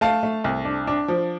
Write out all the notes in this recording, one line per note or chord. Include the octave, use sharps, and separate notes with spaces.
A3 F5 A5
A3
C2
D4
D4
F3